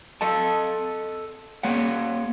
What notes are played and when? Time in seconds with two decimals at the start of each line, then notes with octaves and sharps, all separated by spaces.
0.21 A4 D#5 A5
1.63 A#3 C#5 F#5